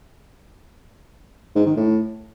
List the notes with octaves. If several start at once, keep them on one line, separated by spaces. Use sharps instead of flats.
G#2
D#3
A2